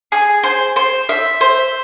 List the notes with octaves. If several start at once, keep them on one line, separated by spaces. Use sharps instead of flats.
G#4
C5
C5
E5
C5